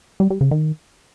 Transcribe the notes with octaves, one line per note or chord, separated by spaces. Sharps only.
G3
G3
C#3
D#3